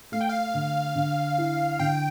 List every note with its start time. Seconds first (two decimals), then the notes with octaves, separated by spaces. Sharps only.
0.12 A3 F5
0.21 G5
0.29 F5
0.54 D3
0.95 D3
1.38 E4
1.79 D3 G5